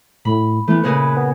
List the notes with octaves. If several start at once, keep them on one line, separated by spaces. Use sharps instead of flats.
A2 B5
E3 A3 B3
A#2 C#3 B4 G#5
B3